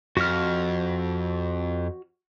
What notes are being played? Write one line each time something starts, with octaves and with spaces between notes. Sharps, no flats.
F2 F#4 F6